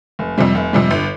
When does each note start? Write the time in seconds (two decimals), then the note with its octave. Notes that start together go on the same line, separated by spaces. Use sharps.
0.19 F1
0.38 F2 C3 G3
0.55 F1
0.73 F2 C3 G3
0.91 G1